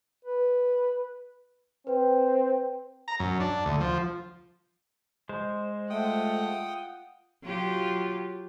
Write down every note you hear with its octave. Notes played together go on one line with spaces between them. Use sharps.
B4
C4 B4 C5 G5
A#5
F#2
D4
D2
F3
G#3 C5
A3 F4 F#5 G5 D#6
F#3 F4 G4